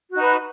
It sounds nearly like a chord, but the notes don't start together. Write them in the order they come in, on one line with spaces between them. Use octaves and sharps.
F#4 D#4 B4